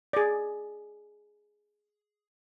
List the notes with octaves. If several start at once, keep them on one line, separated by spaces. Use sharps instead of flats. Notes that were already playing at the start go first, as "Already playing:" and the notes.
G#4 D5